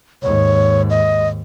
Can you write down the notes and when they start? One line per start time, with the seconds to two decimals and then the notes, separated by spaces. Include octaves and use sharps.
0.23 D#2 G#2 C#5
0.90 D#5